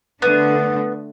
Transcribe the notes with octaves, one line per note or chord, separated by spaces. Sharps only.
D3 A3 B3 D4